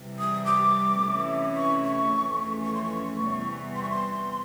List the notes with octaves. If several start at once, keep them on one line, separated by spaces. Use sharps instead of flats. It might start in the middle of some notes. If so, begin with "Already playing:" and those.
Already playing: C3 E3 G3
D#6
D6
C3 E3 A3 C#4 E4
C#6
C#6
F2 C#3 E3 A3 C#4
C#6
C6
C#6
E2 C3 E3 G3 B3
C6
C#6
C6